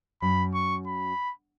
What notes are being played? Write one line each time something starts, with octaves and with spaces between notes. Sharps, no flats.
F#2 B5
C#6
B5